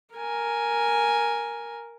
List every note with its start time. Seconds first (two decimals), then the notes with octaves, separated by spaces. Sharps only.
0.15 A#4 G#5